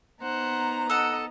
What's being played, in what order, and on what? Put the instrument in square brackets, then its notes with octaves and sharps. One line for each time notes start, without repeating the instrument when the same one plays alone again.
[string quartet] B3 D#4 A#5 [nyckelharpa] C5 F#5
[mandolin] A4 F#5 [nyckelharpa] D#5